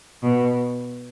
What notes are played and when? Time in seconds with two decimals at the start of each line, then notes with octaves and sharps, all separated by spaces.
0.23 B2